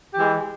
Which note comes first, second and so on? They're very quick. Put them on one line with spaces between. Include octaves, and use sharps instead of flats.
G4 E3 G#3